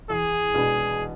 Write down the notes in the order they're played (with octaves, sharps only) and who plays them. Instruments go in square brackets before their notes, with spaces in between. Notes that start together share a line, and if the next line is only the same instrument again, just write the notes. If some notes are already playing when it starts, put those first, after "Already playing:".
[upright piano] E2 [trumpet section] G#4
[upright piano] B2 G#3 B3 D4